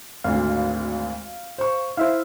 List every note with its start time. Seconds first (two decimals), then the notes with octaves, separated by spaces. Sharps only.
0.24 G#1 D2 F5
1.58 C5 C#6
1.97 E4 C5 E5 F5